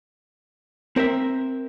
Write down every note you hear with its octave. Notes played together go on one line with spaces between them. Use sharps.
C4 A#4 C5 E5